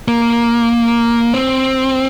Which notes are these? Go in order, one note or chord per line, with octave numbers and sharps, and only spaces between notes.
A#3
C4